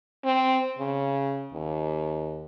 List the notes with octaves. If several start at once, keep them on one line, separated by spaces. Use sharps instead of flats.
C4
C#3
D#2